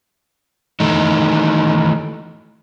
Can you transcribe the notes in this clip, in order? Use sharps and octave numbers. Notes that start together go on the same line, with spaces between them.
D#3 E3 A3 D#4